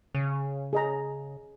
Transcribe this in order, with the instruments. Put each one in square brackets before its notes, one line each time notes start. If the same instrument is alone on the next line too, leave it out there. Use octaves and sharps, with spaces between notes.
[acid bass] C#3
[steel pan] G#4 D#5 A#5